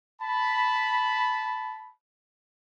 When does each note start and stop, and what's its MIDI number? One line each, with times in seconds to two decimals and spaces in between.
0.22 1.91 81
0.22 1.91 83